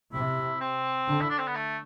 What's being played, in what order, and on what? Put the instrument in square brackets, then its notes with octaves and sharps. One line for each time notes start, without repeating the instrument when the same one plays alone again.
[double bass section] C3 [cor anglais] E4
[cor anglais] C4
[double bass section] D3
[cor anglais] E4
D4
C4
B3
A3